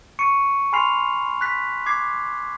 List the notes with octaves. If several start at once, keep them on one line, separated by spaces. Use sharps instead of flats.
C#6 C#7 D#7
G#5 B5 C6 F6 C7 F7
F#6 B6
D6 G#6 C7